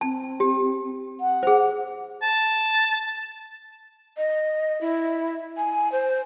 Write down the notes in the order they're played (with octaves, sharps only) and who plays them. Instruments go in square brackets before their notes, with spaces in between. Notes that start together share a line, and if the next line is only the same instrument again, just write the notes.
[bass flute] C4 [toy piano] A5
[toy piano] G4
[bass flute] F#5
[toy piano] G#4 C5
[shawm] A5
[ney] D#5
E4
G#5
C5